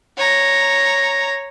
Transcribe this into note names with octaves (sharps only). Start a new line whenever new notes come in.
C#5 A#5